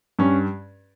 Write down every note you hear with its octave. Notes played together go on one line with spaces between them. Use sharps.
G2 C#4